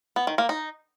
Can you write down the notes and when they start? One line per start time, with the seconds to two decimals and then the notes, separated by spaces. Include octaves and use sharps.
0.16 B3
0.27 D#3
0.38 A#3
0.49 D#4